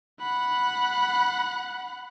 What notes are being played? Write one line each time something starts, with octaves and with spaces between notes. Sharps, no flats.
F#5 B5